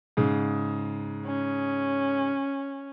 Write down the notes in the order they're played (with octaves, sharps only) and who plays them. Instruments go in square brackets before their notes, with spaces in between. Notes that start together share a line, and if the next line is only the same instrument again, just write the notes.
[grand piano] G#2 C#3
[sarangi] C#4